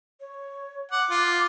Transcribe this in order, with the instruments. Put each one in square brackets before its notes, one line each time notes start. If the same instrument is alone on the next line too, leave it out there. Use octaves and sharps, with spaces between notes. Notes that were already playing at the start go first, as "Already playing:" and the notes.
[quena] C#5
[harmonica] F#5 [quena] D6
[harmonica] F4